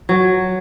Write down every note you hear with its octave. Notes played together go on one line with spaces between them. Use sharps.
F#3